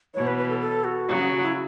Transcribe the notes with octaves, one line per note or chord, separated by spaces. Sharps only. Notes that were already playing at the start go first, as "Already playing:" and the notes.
B2 E3 C#5
B4
B4
A4
A4
F#4
C#3 F#3
E4